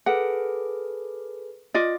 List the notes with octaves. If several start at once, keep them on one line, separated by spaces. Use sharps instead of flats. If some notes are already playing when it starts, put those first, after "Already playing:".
G#4 A4 B4 F#5
F4 D5 D#5